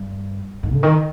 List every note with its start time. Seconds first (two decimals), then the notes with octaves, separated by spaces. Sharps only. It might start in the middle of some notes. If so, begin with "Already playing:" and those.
Already playing: G2
0.63 G#2
0.73 D3
0.83 D#3